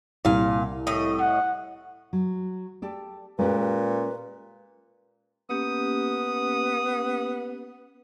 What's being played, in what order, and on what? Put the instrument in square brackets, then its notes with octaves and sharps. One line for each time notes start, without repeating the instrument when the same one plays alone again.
[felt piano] C2 [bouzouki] A#2 F5
[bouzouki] A2 D#5
[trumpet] F#5
[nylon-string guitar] F#3
G4 A4 D5
[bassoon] A#2 [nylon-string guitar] G#3 C#4 G4 [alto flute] B4
[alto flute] B4
[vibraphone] A#3 C#4 G4 [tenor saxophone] B3 [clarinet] D#6